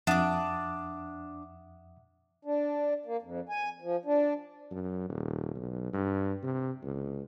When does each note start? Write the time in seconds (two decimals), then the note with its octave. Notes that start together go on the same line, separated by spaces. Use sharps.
0.07 F2 D4 E5 F#5 D6 D#6
2.45 D4
3.05 A#3
3.22 F2
3.49 G#5
3.82 F3
4.05 D4
4.71 F#2
5.09 D#1
5.55 B1
5.93 G2
6.43 C3
6.83 C#2